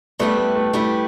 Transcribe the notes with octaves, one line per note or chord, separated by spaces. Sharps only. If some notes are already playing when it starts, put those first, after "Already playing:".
G3 A3 B3 E4 G4
A3
A3
G3 A3 B3 E4 G4